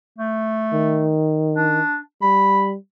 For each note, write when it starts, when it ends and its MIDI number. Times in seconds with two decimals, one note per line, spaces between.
0.19 1.16 57
0.73 1.80 51
1.56 1.96 62
2.22 2.76 55
2.22 2.68 83